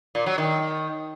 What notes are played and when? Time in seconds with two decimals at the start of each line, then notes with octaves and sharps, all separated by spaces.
0.15 A#2
0.26 F#3
0.38 D#3